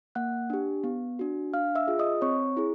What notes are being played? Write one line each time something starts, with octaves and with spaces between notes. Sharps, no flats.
A#3 F#5 F#6
D4 G4
B3
D4 F#4
D4 F5 F6
E5 E6
F4 G#4
D#5 D#6
C4 C#5 C#6
E4 G#4